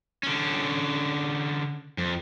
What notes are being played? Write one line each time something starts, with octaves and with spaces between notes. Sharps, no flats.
D3 C#4
F2